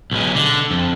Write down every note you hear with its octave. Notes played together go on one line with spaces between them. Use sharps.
B1 G#3
D3
F2